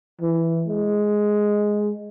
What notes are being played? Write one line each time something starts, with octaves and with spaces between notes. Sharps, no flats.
E3
G#3